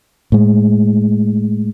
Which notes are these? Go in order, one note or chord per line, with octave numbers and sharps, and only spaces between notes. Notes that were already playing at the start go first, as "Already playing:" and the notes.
A2 G#3